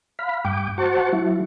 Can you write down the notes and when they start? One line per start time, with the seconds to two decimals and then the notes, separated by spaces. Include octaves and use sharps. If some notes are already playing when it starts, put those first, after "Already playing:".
0.19 F5 B5
0.45 G2 G5 D6
0.78 F#4 C5 F#5 A5 C#6
1.13 F#3 E4